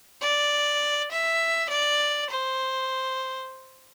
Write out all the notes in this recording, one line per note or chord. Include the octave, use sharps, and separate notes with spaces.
D5
E5
D5
C5